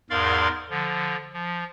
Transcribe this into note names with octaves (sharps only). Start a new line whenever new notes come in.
E2 G#2 A#4 D5 F5 C6
D3 F3
F3